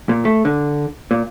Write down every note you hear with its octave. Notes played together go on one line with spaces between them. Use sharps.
A#2
A3
D3
A#2